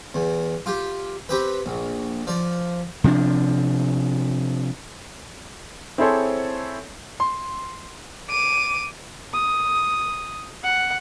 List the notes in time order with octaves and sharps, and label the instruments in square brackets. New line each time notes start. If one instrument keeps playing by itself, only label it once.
[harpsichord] E2
F4 G4
C4 G4 B4
A#1
F3 D5
[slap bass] C3 F3 C4 D4
[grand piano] C4 E4 G#4 A4 C5 C#5
C6
[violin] D6 D#7
[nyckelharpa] D#6
F#5